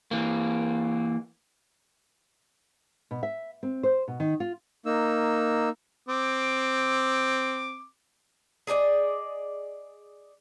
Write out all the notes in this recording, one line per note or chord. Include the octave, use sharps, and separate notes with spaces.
E3 A#3
B2
E5
C4
C5
B2
D#3
F4
A#3 D#4 E6
C4 D6
G#4 A4 D5 D#5